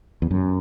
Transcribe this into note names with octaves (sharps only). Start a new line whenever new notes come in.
E2
F#2